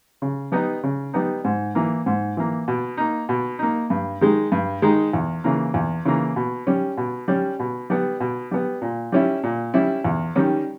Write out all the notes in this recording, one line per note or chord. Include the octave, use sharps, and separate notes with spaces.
C#3
G3 B3 D#4
C#3
G3 B3 D#4
G#2
E3 A#3
G#2
E3 A#3
B2
A#3 D#4
B2
A#3 D#4
G2
D#3 G#3 D#4
G2
D#3 G#3 D#4
E2
C#3 E3 A#3
E2
C#3 E3 A#3
B2
G3 C#4
B2
G3 C#4
B2
G3 B3
B2
G3 B3
A#2
G3 C#4 E4
A#2
G3 C#4 E4
E2
D#3 G3 C#4